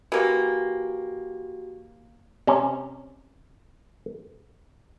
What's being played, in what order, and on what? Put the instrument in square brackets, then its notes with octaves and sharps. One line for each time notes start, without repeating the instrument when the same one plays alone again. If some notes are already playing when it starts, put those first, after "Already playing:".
[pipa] E3 A#3 [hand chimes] F#4 G4
[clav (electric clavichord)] C3 C#4